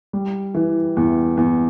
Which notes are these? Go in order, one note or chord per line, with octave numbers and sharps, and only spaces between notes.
G3
E3
E2
E2